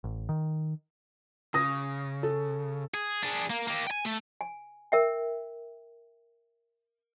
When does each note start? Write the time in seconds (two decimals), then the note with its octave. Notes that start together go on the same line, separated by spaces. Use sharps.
0.04 A1
0.29 D#3
1.54 C#3 D#6 A#6
2.23 A4
2.94 G#4
3.23 D4 G#4
3.50 A#3
3.67 A#3 G4
3.87 G5 G#5
4.05 A3
4.41 G#5
4.92 A#4 E5 G5